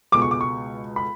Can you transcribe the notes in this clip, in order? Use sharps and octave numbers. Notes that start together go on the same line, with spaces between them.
C#2 B2 G#3 D6
C#6
D6
C#6
B5